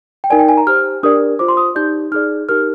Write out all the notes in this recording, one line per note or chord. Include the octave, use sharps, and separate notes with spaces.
G5
D#4 A#4 D5 G#5
G5
G#5
A#5
G4 C5 F6
D4 G4 A#4 D5 D#6
F4 C5 D6
C6
D#6
D#4 G4 D5 G6
D#4 G#4 D5 F6
D#4 G4 A#4 F6